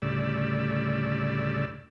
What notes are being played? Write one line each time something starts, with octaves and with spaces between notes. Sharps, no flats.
D2 A2 C#3 G3 D5 E6